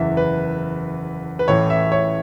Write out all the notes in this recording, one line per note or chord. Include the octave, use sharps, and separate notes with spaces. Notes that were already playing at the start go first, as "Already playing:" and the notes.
Already playing: F#1 E2 E3 E5
B4
B4
A1 A2 E3 C#5
E5
C#5